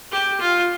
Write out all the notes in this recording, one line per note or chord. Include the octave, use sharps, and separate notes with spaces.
G4
F4